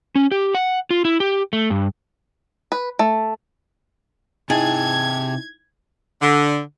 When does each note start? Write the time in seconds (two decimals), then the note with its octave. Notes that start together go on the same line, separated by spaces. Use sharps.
0.15 C#4
0.32 G4
0.54 F#5
0.90 F4
1.05 E4
1.20 G4
1.53 A3
1.70 G2
2.72 B4
2.99 A3
4.50 C3 D#4 E4 G#4 D#5 G5 A5 G#6
6.21 D3